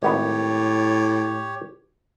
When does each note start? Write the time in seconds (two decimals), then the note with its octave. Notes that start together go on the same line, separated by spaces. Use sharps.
0.03 G#1 F#2 A2 B3 G4 C#5